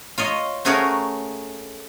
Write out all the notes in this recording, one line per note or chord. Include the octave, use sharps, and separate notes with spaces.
F4 C#5 D#5
A3 C#4 F#4 G#4 A#4 C#5